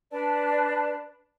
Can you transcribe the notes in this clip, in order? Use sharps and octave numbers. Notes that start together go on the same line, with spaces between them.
D4 B4 D5 A5